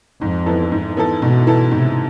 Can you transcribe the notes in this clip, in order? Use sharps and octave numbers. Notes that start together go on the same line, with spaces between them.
F2 G#2
E3 B3 E4 A4
G#2
E3 B3 E4 A4
G#2 B2
E3 B3 E4 A4
G#2 C3